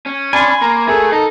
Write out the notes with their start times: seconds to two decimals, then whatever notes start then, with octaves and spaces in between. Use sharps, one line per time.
0.06 C#4
0.33 D4 G#5 B5 C6
0.62 A#3 A#5
0.88 A3 G#4 A#4
1.12 D#4 A4